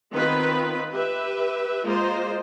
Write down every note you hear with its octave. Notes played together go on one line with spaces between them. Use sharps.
D#3 B3 C4 F4 B4
G4 B4 E5
G#3 A#3 F4 C5 D#5